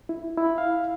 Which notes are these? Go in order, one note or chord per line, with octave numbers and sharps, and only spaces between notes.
E4
E4
F5